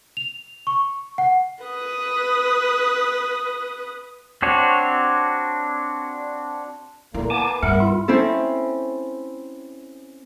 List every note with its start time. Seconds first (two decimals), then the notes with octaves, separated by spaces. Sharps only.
0.17 F7
0.67 C#6
1.18 F#5
1.64 B4 D#6
4.42 C4 D4 F#4 C#5
7.14 A#2 D3 A#3 E4
7.30 A#3 B3 G#5 A5 D6
7.63 G2 B3 A#4 E5 F#5
7.80 E4 F4
8.08 C4 C#4 E4 A4